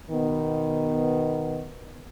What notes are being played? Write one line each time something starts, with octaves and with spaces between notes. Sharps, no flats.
B2 D#3 B3